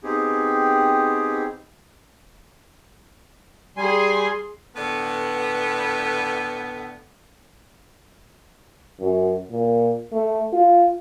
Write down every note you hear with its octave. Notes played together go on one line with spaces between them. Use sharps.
B3 C4 D#4 G4 G#4
G3 G#4 G#5 C6
A2 D3 B3
F#2
A#2
A3
F4